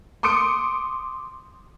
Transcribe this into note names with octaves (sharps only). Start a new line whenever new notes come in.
C6 D6 D#6 C#7 D7